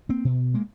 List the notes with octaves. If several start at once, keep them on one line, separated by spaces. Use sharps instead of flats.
A#3 C4
B2
G#3 A#3